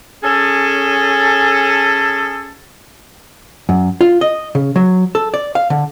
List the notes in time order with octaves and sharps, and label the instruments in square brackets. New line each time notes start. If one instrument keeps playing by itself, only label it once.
[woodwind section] C#4 G#4 A4
[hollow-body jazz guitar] F#2
F4
D#5
C#3
F#3
A4
D5
F5
D3